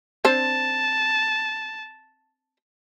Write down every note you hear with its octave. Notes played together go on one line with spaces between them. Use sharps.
C4 D4 C5 A5